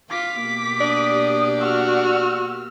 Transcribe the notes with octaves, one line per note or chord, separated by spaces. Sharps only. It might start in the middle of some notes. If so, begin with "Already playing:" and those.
F4 D6 B6
B2 A#3 G4
D4 D#6
F#4 E6 F6